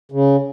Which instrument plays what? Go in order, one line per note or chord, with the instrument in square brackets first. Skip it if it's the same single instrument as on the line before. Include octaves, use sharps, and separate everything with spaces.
[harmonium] C#3